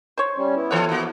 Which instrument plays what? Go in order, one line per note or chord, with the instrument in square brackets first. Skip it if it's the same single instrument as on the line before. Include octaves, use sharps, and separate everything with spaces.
[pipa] C5 C#5
[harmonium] G3 C#4
B3 E4
[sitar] E3 A4 C#5 [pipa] C5 F#5
[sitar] A#3 F#4